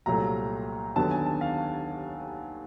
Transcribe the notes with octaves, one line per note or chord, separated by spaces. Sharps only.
C2 A#2 F#3 A3 A#5
D#2 D3 F#3 B3 A5
G#5
A5
F5